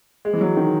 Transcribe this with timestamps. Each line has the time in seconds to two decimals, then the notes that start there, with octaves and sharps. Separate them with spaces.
0.25 G#3
0.33 E3
0.41 F#3
0.57 D#3